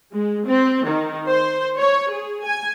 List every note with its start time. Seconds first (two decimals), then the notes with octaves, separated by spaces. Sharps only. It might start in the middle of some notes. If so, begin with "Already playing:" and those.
0.12 G#3
0.45 C4
0.84 D#3
1.29 C5
1.77 C#5
2.10 G#4
2.43 G#5